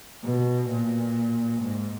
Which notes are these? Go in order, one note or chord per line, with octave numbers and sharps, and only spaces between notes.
B2
A#2
G#2